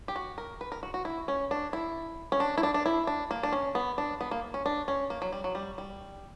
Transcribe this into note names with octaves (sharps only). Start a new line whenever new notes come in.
G4
F#4
A#4
B4
A#4
F#4
F#4
E4
C#4
D4
E4
C#4
D4
E4
D4
D4
E4
D4
A#3
D4
C#4
B3
D4
B3
A#3
C#4
D4
C#4
A#3
F#3
G3
F#3
G3
G3